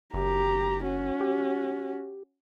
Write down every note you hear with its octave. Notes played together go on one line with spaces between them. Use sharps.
F#1 G4 A#5
C#4 F#4
G4